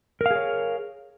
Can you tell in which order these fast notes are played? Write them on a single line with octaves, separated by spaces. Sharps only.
A#4 F5 G#4 C#5